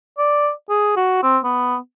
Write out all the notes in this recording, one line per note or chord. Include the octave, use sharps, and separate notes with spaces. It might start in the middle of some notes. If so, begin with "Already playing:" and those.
D5
G#4
F#4
C4
B3